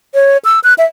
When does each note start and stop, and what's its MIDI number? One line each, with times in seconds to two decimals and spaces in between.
0.14 0.37 73
0.45 0.60 88
0.64 0.74 90
0.78 0.86 76